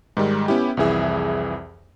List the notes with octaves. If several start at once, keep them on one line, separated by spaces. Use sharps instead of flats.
G#2 D#3 G3 G#3
B3 C#4 E4 G4
C2 F2 E3 G#4 E5